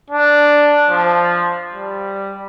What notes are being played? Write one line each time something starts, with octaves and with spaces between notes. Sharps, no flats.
D4
F3
G3